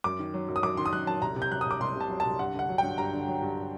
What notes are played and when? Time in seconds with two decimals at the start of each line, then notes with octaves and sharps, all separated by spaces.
0.04 F#2 D6
0.19 D#3
0.34 F#3
0.48 F#2
0.56 D#6
0.63 F#2 D6
0.77 D#3 C6
0.86 D#6
0.93 F#3 F#6
1.07 F#2 A5
1.22 C2 A#5
1.36 C3
1.42 G6
1.51 F#3 F#6
1.61 D#6
1.66 C2 D6
1.80 C2 C6
1.96 C3 A5
2.10 F#3
2.20 C2 A5
2.39 G2 F#5
2.54 D3 F#5
2.69 F#3
2.78 G2 G5
2.98 G2 A#5
3.13 D3
3.28 F#3
3.42 G2